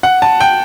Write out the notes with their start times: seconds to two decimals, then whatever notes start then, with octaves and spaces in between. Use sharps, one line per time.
0.03 F#5
0.22 A5
0.40 G5